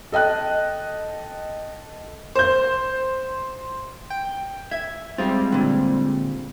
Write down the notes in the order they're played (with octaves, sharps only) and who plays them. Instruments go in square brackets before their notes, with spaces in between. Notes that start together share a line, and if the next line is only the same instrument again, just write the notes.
[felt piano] A4 D#5 G5 F#6
[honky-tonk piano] C5 G6
[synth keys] G5
[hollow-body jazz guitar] E5 [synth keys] G#6
[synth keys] G3 G#3 C4 [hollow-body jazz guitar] F4
[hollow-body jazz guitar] A#2 D3